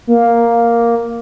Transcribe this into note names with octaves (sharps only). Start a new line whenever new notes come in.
A#3